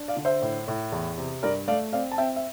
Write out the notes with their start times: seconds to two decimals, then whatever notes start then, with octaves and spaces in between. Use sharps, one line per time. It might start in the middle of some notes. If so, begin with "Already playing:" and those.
Already playing: D4
0.08 D5 F5
0.16 D3
0.25 C5 E5
0.42 A2
0.68 A2
0.92 E2
1.18 C3
1.43 G2 A#4 D5
1.68 A3 D5 F5
1.93 C4 D5 F5
2.12 A5
2.18 C4 E5 G5
2.36 E5